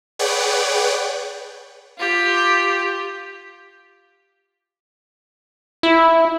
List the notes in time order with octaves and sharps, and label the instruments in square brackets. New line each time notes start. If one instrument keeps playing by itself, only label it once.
[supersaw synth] G#4 B4 C#5 D5 F#5 G5
[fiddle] F4 G4
[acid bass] E4